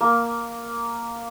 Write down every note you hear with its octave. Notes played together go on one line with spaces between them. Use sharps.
A#3